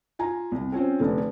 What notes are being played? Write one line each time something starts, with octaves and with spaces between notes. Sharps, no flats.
F4 G#5 A#5
C2
C4 C#4 F4 C5
F1 D3 B4